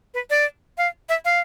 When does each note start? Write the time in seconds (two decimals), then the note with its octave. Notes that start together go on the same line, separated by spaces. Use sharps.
0.14 B4
0.30 D5
0.78 F5
1.09 E5
1.25 F5